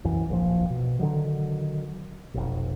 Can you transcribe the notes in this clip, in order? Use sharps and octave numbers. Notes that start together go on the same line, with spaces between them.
C2 F#2 E3
D1 A#1 A#2 F3
B2
D3 D#3 F#3
F1 B1